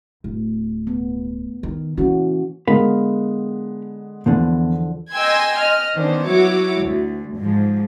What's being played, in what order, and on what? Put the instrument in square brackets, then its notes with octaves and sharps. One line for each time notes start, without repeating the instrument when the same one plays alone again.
[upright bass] D1
[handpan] B3
[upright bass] D#3
[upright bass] E3 [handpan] A#3 C#4 F#4
[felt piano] D3 G#3 B3 [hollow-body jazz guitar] A#4 F5 B5
[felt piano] E2 [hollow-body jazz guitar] D3 E3 F3
[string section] D#5 G5 G#5 C6 E6 G#6
D#5 F6
D#3 B3 C#4 D4 C5
F#3 E4 F#4 C#5 D6
D2
G#2 F3